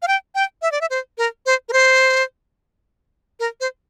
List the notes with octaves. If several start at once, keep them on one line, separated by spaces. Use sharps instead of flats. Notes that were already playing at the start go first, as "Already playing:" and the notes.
F5
G5
G5
E5
D5
E5
C5
A#4
C5
A#4
C5
A#4
C5